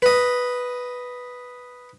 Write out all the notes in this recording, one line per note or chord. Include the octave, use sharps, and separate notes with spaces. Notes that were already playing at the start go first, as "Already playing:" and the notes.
B4 D#5